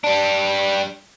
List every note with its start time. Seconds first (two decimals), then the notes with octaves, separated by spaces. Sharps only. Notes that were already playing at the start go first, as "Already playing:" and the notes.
0.04 G3 D4